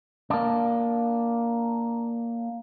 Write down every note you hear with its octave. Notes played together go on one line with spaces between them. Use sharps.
A#3 D4